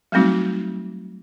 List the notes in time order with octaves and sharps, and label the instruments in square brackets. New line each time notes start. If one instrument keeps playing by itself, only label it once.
[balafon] F#3 G3 A3 C4 D#4 F#4